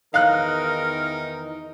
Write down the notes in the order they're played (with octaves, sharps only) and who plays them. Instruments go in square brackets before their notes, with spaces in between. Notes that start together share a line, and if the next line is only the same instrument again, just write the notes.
[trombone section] E2 D#3 E3 [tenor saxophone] D#4 [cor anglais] A#4 [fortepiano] F5 F#6